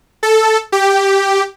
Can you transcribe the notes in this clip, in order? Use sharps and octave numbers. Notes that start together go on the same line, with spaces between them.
A4
G4